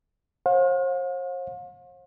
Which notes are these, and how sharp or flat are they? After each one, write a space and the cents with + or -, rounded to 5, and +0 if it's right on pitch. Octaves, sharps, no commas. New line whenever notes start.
C5 +45 F5 +45